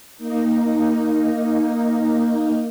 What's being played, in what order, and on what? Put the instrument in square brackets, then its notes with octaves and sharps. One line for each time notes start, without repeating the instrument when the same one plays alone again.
[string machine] A#3 D#4